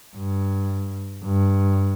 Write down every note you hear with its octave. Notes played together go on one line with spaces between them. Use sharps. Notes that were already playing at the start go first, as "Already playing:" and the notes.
G2
G2